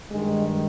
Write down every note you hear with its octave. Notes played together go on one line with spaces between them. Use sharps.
G2 D#3 G#3